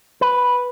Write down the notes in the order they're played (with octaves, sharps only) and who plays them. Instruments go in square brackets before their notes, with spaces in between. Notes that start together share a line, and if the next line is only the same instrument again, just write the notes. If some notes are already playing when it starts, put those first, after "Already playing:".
[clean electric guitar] B4